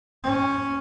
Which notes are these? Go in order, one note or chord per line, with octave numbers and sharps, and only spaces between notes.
C#4